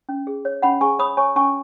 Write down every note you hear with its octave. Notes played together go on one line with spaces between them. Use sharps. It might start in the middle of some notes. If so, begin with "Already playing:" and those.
C#4
G#4
C#5
C#4 F#5 B5
G#4 G#5 C#6
C#5 B5 D#6
C#5 G#5 C#6
C#4 G#5 C#6